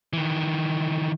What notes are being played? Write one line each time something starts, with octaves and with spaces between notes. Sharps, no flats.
D#3 E3